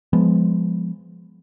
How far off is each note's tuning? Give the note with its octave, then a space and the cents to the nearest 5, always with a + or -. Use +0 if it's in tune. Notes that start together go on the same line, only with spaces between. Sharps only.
F3 +5 G#3 -15 B3 +0